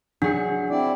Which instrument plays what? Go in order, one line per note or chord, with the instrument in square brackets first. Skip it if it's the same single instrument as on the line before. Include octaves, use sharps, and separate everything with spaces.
[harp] F#3 G#4 C#7 [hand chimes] D4
[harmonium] C4 E4 D5